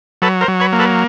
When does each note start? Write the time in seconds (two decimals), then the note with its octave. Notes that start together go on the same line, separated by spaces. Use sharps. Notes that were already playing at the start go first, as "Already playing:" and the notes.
0.22 F#3 A4 B4
0.41 A#4 C5
0.48 F#3
0.60 B4 C#5
0.73 A#3
0.79 A4 B4